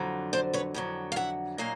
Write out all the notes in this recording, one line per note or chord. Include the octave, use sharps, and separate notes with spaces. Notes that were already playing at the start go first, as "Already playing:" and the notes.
Already playing: F2 D3 F#3
C5 D5
B4 C#5
F2 D3 F#3
F5
E5 F#5
A#2 F#3 A#3 D#5 F5